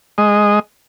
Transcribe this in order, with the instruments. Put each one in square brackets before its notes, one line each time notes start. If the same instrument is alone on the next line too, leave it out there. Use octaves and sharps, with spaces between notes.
[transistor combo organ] G#3 D#5